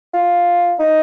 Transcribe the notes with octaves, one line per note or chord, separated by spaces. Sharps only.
F4
D#4